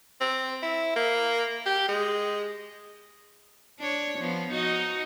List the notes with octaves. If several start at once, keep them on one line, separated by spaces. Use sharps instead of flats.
C4
E4
A#3
G4
G#3
D4 C#5
F3 B3
D#4 F#4 D#5